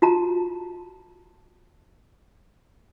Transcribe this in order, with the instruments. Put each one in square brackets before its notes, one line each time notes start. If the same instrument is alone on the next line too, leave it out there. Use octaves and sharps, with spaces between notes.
[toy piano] F4 F#4 A5 A#5